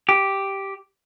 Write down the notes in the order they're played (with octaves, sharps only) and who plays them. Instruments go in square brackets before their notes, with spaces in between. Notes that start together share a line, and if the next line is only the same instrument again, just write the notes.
[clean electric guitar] G4